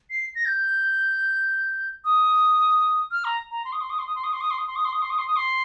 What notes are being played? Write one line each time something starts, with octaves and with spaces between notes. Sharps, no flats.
C7
A#6
G6
D#6
F6
A#5
A#5
C6
D#6
C6
D#6
C6
D#6
C6
D#6
C6
D#6
C6
D#6
C6
D#6
C6
D#6
C6
D#6
C6
D#6
C6